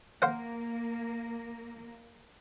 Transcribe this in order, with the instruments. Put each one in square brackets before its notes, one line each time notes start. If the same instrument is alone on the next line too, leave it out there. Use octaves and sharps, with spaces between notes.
[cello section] A#3 [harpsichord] C5 F5 F#5